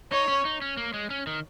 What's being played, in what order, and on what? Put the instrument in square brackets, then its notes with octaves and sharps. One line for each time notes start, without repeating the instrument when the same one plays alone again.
[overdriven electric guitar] D#4 [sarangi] C#5
[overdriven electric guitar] C#4
D#4
C#4
A#3
G#3
C#4
D#3